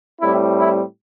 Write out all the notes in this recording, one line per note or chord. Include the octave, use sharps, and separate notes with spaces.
A2 G3 C4 E4
E4